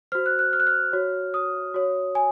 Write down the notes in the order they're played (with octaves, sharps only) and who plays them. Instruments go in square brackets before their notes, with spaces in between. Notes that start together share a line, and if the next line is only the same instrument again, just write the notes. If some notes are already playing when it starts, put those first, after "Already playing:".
[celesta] F#4 C5 F6
F#6
F#6
F6
F#6
F6
F#4 C#5
D#6
F#4 C#5
G#5